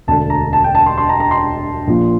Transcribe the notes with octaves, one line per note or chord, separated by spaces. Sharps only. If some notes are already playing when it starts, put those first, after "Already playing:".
E1 D2 D3 A5
A#5
A5
G5
A5
C6
C6
A#5
A#5
C6
A#1 A#2 F3